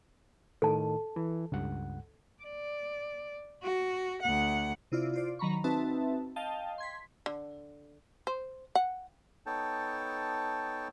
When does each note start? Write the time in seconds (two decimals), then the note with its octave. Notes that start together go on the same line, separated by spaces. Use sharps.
0.62 A2 D#3 A4 A5
1.16 E3
1.52 C#2 G2 F#5
2.43 D5
3.63 F#4
4.22 D2 F#5
4.92 C3 E4 F4 D5
5.13 F4 C5 D5
5.39 D#3 F#3 A#5 B5 C#6
5.64 C4 D#4 F#4 B4 E5 A5
6.36 D#5 F5 G5 A5
6.78 C6 G#6 B6
7.26 D3
8.27 C5
8.75 F#5
9.46 B3 D#4 A4 C#5 G5 A5